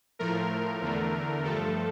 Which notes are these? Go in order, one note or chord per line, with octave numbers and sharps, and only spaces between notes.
A2 F3 A3 A#4
E2 D3 A3
G2 F3 A3 A4